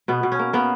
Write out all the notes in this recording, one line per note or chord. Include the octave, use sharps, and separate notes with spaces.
B2 B3
B2
C#4
A#3
A#3 B3